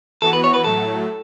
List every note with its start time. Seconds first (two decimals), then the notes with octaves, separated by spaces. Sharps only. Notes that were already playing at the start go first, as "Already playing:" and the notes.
0.22 E3 B3 F#4 A4
0.33 B4
0.44 C#5
0.54 B4
0.64 A2 F#3 A3 A4